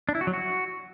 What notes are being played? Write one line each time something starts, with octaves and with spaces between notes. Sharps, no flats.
D4
E4
F#4
F#3
F#4